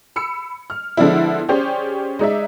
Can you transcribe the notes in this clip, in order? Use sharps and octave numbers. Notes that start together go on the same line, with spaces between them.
B5 E6 C#7
F6
D3 F3 G#3 B3 D4 E4
C#4 G4 G#4 C5 D5
G#3 D#4 D5 E5